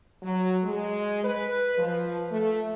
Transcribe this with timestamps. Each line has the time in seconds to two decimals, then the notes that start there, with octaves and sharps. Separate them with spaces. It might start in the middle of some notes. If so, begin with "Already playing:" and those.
0.23 F#3
0.64 G#3
1.24 B4
1.78 F3
2.31 A3